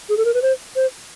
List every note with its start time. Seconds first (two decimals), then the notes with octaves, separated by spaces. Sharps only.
0.09 G#4
0.17 A4
0.25 A#4
0.34 B4
0.42 C5
0.76 C5